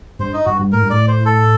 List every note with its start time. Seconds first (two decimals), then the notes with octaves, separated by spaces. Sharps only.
0.19 G2 C5
0.34 D#4
0.46 G2 F#4
0.59 G2
0.72 A2 A#4
0.82 G2
0.90 A2 D5
1.08 C5
1.26 A4